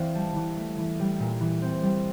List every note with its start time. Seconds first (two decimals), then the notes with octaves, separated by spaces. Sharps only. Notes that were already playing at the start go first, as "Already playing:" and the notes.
Already playing: E3 C4 D5 F5 G5
0.15 G3 A5
0.36 E3
0.57 A3
0.78 E3
0.99 G3
1.20 A#2
1.41 E3
1.62 C4
1.83 G3